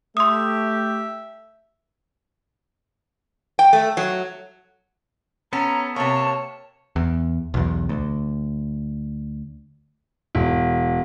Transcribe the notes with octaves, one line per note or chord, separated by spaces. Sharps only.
A3 G4 E5 C6 D#6
G5
A3
F#3
B3 C#4 A4 A#5
C3 A#3 C#5 A5
E2
B1 E2
D2
E1